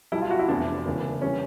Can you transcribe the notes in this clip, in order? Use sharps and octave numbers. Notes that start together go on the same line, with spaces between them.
B1 B2 G3 E4
F4
F#4
E4
F1 E2 C3 D4
E1 D#2 C#3 E3
E3 G3 C#4